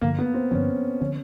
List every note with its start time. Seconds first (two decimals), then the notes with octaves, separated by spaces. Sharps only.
0.01 G2 D3 F3 A#3
0.19 B3
0.34 C4
0.51 G2 D3 F3 C#4
1.01 D3 F3 C#4